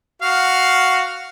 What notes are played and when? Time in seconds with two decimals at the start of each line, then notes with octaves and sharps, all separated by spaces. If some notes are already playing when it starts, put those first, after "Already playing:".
0.22 F#4 F5